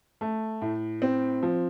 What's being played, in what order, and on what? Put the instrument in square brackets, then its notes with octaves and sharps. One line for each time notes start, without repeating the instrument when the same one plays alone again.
[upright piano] A3
A2
C4
F3